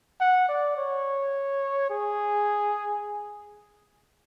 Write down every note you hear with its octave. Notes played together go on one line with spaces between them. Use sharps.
F#5
D5
C#5
G#4